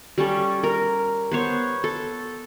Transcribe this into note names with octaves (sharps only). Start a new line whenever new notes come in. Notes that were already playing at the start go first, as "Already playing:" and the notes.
G3 C#4 A4
A#4
B3 C5 C#5
A4